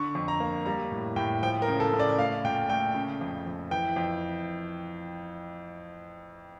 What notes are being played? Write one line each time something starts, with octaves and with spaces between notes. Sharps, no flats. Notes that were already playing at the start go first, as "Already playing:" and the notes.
Already playing: D3 C#6
F2
A#5
A#3
G3 A#5
A2
A2 G5
F3 G5
A#4
C#3
A4
C#3
D5
A3 F5
A#2 G5
A3 G5
C#3
F2
F2
E3 G5
F2